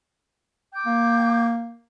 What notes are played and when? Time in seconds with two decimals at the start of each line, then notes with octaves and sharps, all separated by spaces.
0.73 G5 D6 G6
0.86 A#3